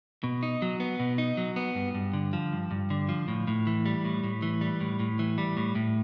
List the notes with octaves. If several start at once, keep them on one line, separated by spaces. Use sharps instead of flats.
B2
D#4
F#3
B3
B2
D#4
F#3
B3
G2
G2
D3
F3
G2
G2
D3
F3
A2
A2
E3
G3
A2
A2
E3
G3
A2
A2
E3
G3
A2
A2